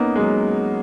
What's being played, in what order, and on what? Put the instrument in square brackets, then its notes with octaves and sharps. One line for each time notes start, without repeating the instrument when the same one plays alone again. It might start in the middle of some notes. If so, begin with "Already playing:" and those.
Already playing: [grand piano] A#3 B3 C#4 D#4
G#3
F#3